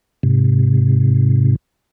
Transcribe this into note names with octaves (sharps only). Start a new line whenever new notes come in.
G#2 C3